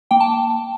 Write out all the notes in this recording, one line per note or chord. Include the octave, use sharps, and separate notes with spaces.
A#3 G5
A5